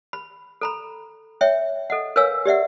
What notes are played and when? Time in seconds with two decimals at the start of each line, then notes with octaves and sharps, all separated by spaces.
0.13 B5
0.61 A4 A#5 B5
1.41 C#5 E5 G5
1.90 A4 D#5 F#5
2.16 A#4 B4 C#5 F5 G#5 E6
2.45 G4 D5 E5 F#5